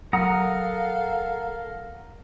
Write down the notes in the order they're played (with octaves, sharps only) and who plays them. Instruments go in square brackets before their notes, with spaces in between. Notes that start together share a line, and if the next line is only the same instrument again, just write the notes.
[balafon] F#3 [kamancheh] A4 F5 [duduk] A#4 [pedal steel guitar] F#5 A#5 D#6